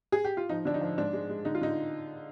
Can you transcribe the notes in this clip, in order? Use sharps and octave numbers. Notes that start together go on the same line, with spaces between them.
G#4
G4
F4
F3 D#4
D3 D4
D#4
F3
G#2 D4
G#3
G#3
D3 D#4
F4
D3 D#4